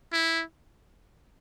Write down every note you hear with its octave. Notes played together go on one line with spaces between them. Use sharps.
E4